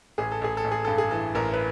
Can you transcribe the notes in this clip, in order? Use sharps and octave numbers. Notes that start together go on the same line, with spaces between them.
A1 G#4
A4
A1 G#4
A4
A1
G#4
G2 A4
G#4
E3 A4
A1 A#4
B4